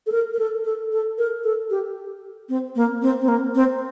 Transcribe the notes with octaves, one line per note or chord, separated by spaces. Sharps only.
A4
A#4
A#4
A4
A4
A4
A#4
A4
G4
C4
A#3
C4
C4
A#3
C4